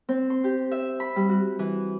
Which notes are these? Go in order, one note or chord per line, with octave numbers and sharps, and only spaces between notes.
C4
C6
G4
E5
B5
G3
F#4
E3